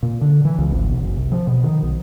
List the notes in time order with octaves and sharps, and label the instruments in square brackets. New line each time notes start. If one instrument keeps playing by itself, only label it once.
[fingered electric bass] A#2
D3
E3
C#2
G#1
B1
F#1
C2
F3
B2
D#3
B1